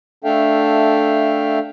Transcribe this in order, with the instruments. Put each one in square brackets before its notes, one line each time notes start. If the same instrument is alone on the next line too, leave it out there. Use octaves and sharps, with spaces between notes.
[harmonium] A3 D4 A4 E5 F5 G5